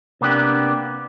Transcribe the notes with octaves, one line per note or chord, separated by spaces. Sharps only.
C3 A#3 B3 D4 G4